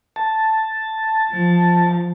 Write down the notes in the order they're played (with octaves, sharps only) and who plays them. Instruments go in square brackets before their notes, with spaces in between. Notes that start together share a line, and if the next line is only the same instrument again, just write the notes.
[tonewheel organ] A5
[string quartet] F3